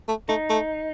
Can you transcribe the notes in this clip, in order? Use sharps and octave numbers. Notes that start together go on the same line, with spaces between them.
A3
A3 D#4
A3